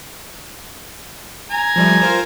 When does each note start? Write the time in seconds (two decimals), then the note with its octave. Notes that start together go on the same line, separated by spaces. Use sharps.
1.51 G#5 A#5
1.76 F3 G3 A3
2.02 F4 A#4 C5